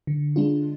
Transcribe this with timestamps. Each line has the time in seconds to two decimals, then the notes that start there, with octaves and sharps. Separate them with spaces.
0.07 D3
0.36 G#3 D4 F4